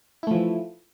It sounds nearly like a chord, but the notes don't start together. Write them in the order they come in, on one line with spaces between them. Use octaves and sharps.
E4 A3 F3 E3